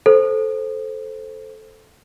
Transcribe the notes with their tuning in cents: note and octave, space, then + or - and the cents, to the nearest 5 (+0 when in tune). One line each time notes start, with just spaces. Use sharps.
A4 -5 C5 +0